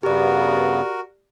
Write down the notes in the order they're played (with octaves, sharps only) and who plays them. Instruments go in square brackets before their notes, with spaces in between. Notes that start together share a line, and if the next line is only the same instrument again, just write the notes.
[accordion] G2 C#3 B3 [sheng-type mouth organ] F#4 A#4 [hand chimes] G4 D5